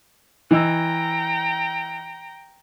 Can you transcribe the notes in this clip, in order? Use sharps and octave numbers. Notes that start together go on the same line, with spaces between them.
E3 D#5 G5 A#5 E6